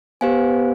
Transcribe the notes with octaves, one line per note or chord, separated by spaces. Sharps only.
B3 G4 C5 F5 G#5